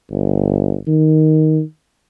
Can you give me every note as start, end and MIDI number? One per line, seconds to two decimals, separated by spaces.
0.12 0.76 31
0.87 1.61 51